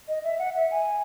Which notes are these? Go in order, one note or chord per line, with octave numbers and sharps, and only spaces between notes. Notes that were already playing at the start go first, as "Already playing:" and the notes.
D#5
E5
F#5
E5
G#5